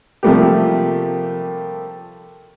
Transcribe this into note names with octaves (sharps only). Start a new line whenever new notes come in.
C3 F3 G3 A3 A#3 G4